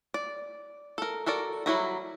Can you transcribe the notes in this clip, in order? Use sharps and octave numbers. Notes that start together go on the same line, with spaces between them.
D5
A4 A#4
F#4 A4 A#4 D5
F#3 G3 E4 F#4 A#5